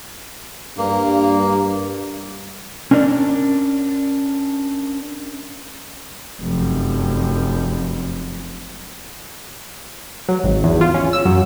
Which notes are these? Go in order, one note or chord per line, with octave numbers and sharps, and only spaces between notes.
G2 A#3
C#4 D4 A#4 C5 D5
F1 F#2
F#3
G#1
E2
F4
C#4
E6
F#2